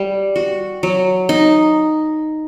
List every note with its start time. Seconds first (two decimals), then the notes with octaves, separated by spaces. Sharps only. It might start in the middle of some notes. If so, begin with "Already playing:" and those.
Already playing: G3
0.36 F#4
0.83 F#3
1.29 D#4